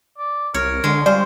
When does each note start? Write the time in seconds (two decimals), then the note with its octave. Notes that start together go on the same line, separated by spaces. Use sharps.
0.18 D5
0.54 C2 A#4 C#5
0.84 D3 G#3
1.06 G3 F4 C5 D5 G#5 C#6